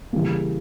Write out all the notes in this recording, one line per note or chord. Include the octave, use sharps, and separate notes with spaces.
C#3 E3 G3 A#3